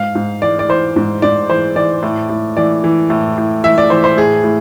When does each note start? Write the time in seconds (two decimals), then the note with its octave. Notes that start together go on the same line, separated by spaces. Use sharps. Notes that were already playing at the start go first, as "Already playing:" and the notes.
Already playing: G#2 F5
0.15 G#2
0.42 E3 D5
0.59 D5
0.68 E3 C5
0.96 G#2
1.22 G#2 D5
1.50 E3 C5
1.76 E3 D5
2.03 A2
2.29 A2
2.57 E3 D5
2.84 E3
3.10 A2
3.38 A2
3.64 E3 E5
3.78 D5
3.90 E3 C5
4.04 C5
4.17 A2 G#4
4.44 A2